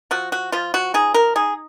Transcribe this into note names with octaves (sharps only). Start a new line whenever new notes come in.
F3 F#4
F#4
F3 F4
F#4
D#4 G#4
A#4
D#4 G#4